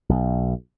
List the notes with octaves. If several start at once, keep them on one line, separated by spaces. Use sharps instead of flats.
B1